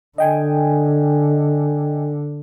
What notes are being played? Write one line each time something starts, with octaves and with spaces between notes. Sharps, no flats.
D3 D#5 G5 G#5